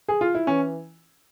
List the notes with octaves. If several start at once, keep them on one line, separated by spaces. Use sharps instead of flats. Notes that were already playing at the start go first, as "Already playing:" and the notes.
G#4
F4
E4
E3 C#4